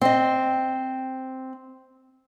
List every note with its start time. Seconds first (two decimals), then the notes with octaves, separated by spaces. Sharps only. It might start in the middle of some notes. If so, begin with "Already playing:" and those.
0.01 C4 D#5